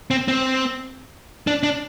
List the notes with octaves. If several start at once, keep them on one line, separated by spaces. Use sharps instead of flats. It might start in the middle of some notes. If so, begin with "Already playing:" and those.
C4
C4
D4
D4